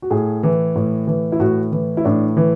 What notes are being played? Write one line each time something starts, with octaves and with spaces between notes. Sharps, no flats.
F#4
A2 G#4
E3
A2
E3
E4
A2 F#4
E3
E4
A2 D4
E3